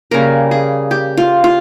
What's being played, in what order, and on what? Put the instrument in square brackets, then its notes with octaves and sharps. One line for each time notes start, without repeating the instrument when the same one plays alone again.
[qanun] C#3 G3 A#3 A#4
G#4
G4
F4
F4